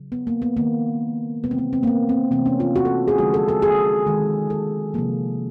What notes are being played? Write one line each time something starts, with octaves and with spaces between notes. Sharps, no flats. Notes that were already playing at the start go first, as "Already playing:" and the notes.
Already playing: C#3 F#3
B3
A#3
B3
D#3 G#3 A#3
C3 E3 G#3 B3
C4
B3
C4
A#3
B3
C4
C3 E3 A3 C4
C#4
F4
F#4
A4
G#4
D3 F3 G#3 F#4
A4
A4
G#4
D#3 G#3
A4
C3 F3 A#3